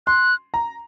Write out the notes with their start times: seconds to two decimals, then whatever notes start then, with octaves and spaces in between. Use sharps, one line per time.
0.07 C6 F#6
0.54 A#5